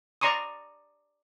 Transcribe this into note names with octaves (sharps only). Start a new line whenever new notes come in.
D5 A#5 C6 C#6 D#6